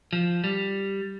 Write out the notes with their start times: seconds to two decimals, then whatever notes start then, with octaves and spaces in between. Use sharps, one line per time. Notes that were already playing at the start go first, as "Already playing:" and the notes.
0.13 F3
0.44 G3